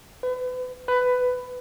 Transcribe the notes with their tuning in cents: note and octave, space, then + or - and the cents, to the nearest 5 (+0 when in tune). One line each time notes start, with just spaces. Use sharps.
B4 +35
B4 +15